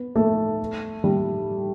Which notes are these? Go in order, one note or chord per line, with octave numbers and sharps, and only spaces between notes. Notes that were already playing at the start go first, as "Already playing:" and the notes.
Already playing: B3
A3
G3